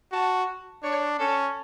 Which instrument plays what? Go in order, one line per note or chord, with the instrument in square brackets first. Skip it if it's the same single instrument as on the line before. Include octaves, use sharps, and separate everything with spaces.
[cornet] F#4 [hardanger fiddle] A5
[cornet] D4 [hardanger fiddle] C#5
[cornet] C#4 [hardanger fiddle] A4